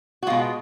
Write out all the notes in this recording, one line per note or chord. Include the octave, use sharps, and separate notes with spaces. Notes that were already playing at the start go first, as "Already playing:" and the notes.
F#4
B2 G#3 F4